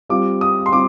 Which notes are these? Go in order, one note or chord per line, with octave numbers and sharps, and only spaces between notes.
G3 C4 F4 D6
D#6
C6
G3 C4 F4 D6